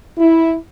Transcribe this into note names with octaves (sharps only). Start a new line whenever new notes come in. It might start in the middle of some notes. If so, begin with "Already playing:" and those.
E4